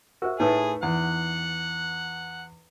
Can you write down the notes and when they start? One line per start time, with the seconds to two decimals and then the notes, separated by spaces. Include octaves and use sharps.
0.22 F#4 A#4 C5 E5
0.40 A2 A3 D#4 E4 G#4 B4
0.83 E2 F#5